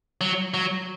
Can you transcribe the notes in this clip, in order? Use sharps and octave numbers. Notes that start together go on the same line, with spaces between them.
F#3
F#3